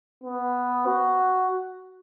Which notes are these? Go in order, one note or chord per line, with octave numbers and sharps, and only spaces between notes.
B3
F#4